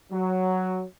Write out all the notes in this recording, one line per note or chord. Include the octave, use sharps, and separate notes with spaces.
F#3